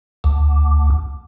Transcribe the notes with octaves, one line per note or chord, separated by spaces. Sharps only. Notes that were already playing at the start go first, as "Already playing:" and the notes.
D2